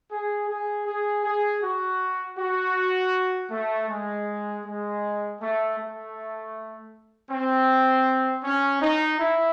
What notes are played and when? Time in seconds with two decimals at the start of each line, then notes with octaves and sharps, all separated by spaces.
0.11 G#4
0.48 G#4
0.86 G#4
1.24 G#4
1.62 F#4
2.38 F#4
3.51 A3
3.89 G#3
4.65 G#3
5.40 A3
5.78 A3
7.29 C4
8.43 C#4
8.81 D#4
9.18 E4